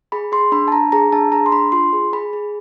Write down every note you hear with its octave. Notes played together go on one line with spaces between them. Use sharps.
G#4 B5
G#4 C6
D4 B5
A5
D4 A#5
G#4 A#5
D4 A5
G#4 A#5
C6
D4 B5
F4 C6
G#4
G#4 B5
G#4